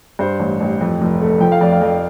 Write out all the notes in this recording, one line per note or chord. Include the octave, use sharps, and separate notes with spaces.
G2 C5
A1
A1
F2
F1
A3
F3 G5
F5
F2 D5
F5
F2